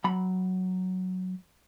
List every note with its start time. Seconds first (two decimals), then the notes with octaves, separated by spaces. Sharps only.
0.04 F#3 B5